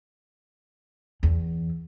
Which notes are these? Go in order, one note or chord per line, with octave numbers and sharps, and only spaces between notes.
E2